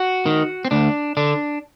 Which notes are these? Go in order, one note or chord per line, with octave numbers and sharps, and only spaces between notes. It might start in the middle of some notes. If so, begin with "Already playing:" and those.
Already playing: F#4
D#3
C4
D2 D4
D3 D4